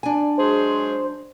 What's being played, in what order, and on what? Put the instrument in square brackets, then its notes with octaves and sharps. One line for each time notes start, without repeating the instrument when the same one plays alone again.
[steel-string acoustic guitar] D4 G#5
[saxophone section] F#3 G#3 G#4 [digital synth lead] C5